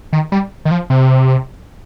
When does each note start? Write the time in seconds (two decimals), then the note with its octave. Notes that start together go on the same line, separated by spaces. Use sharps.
0.13 D#3
0.32 G3
0.65 D#3
0.71 F3
0.90 C3